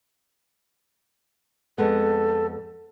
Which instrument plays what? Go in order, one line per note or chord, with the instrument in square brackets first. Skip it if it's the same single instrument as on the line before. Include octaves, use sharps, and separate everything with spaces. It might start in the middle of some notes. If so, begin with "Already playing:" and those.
[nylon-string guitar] F2 G#3 B3 [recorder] A4